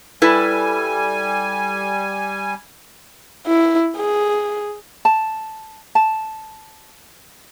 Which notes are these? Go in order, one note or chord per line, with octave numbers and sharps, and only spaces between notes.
G3 E4 A4 B4 G#5
E4
G#4
A5
A5